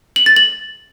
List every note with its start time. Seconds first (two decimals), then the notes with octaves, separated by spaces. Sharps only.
0.16 F#7
0.26 A6
0.36 F#7